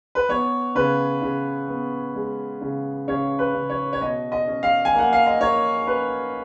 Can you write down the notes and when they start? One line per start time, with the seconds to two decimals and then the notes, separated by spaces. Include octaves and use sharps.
0.15 B4
0.29 B3 C#5
0.75 C#3 B4
1.22 C#3
1.68 B3
2.15 G#3
2.61 C#3
3.08 C#3 C#5
3.39 B4
3.54 C#3
3.70 C#5
3.93 C#5
4.01 B2 D#5
4.32 D#5
4.47 C#4
4.63 F5
4.85 G#5
4.94 A#3 F#5
5.13 F5
5.26 D#5
5.40 A#3 C#5
5.87 C#4 B4